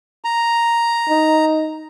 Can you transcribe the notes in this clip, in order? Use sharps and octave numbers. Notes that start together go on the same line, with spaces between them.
A#5
D#4